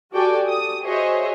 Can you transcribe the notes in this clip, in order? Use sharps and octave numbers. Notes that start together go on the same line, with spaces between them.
F#4 G4 A4 D5 G5 G#5
D#6
F#4 G#4 C5 C#5 D#5 E5